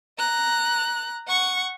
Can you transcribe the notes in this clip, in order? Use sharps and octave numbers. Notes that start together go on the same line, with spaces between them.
A#5 F#6
F#5 C#6